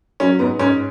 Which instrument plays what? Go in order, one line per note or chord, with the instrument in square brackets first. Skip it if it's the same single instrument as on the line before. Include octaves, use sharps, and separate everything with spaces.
[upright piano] F#3 C#4
G#2 B3
G#2 C#4